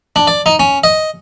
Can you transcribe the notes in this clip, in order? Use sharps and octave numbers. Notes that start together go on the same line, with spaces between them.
D4
D5
D#4
C#4
D#5